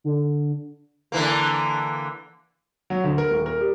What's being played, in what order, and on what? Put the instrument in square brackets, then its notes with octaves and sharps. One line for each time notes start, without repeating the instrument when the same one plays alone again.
[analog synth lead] D3
[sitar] D3 E3 A#3
[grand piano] F#3
D2
A#4
D#1
A#4
G3